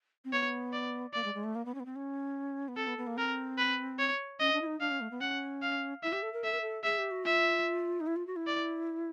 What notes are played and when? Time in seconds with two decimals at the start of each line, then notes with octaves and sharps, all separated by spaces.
0.25 C4
0.33 B3 C#5
0.73 D5
1.13 A#3 D5
1.24 G#3
1.34 G#3
1.44 A3
1.55 A#3
1.65 B3
1.74 C#4
1.80 B3
1.85 C4
1.96 C#4
2.68 B3
2.76 C4 A4
2.87 B3
2.98 B3
3.07 A#3
3.17 C4 A#4
3.58 B4
3.99 C#5
4.40 C#4 D#5
4.53 D4
4.61 E4
4.66 D#4
4.80 D4 F5
4.90 C#4
5.01 A3
5.11 B3
5.21 C#4 F#5
5.62 F5
6.03 E4 E5
6.12 G4
6.22 A4
6.33 A#4
6.44 A4 E5
6.53 A#4
6.61 A4
6.83 G#4 E5
6.98 G4
7.11 F#4
7.24 F4 E5
8.00 D#4
8.07 E4
8.16 F4
8.27 F#4
8.36 E4
8.47 D5